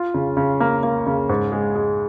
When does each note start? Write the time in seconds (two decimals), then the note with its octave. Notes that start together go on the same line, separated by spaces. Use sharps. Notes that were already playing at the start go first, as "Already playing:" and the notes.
Already playing: F4
0.14 C#3
0.37 C#3
0.60 A#3
0.83 A#3
1.07 C#3
1.29 G#2
1.52 G#3
1.75 G#3